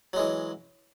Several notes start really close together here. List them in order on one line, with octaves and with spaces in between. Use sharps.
F#3 G#3 E3